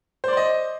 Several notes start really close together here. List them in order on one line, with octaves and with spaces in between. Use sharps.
C5 D5 C6 D#5